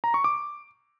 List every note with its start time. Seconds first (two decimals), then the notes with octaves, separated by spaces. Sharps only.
0.04 A#5
0.14 C#6
0.24 D6